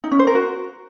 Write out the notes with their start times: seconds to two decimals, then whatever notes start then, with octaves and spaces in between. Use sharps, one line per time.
0.04 D#4
0.11 C#4
0.19 C5
0.27 A#4
0.35 F#4